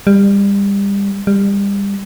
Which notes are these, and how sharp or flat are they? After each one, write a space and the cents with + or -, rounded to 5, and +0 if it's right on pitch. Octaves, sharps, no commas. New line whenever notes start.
G3 +30
G3 +30